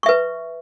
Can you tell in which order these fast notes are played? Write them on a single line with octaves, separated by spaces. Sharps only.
C#6 E5 B4